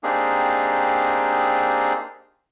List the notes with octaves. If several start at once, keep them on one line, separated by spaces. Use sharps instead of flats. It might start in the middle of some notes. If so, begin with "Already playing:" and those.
A#3 C4 D4 D#4 G4 G#4